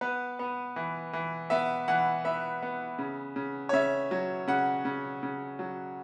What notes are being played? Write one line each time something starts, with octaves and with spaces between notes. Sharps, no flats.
B3 B4
B3
E3
E3
B3 E5
E3 F#5
B3 E5
B3
C#3
C#3
C#5
C#3 E5
F#3
C#3 F#5
C#3
C#3
F#3